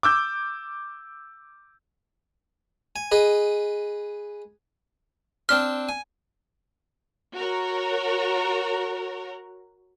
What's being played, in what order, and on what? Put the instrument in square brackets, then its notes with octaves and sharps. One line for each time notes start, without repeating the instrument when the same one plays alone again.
[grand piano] D6 E6 G6
[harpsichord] G#5
G#4 B4 D#5
[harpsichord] C4 D4 C6 [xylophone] F6
[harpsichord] G#5
[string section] F#4 A#4 C#5